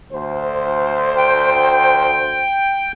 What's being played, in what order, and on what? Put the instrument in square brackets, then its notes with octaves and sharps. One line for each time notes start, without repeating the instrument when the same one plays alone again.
[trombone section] D2 C5
[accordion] G5